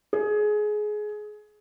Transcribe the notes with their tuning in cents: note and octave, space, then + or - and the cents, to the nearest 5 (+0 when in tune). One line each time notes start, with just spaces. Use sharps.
G#4 +20